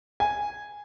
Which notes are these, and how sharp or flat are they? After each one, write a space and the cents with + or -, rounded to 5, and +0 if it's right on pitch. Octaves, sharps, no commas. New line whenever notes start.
G#5 -5